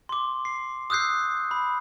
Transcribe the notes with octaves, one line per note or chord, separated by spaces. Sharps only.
C6 D6
C7
D#6 E6 F#6 G6 C7
B5